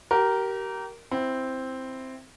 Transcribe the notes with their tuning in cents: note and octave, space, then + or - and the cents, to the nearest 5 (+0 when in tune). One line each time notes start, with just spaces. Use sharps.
G4 -30 A#4 +0
C4 +0 E4 +5